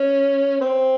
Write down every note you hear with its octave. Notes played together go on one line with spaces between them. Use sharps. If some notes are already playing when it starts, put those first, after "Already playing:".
Already playing: C#4
C4